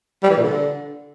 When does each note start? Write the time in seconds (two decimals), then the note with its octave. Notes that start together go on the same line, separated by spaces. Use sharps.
0.23 G3
0.30 E3
0.37 A#2
0.43 D3